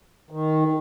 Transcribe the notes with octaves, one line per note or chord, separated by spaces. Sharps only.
D#3